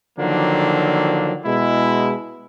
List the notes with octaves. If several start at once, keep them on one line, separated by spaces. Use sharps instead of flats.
D3 D#3 F3 F#3 A#3 D4
B2 G#3 E4